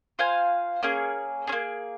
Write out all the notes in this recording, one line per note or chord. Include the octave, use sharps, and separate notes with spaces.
F4 C5 F5 G#5
A#3 C#4 G#4
A#3 C#4 G#4